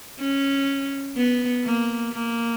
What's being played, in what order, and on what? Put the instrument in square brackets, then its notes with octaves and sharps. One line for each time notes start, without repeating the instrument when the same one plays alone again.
[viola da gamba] C#4
B3
A#3
A#3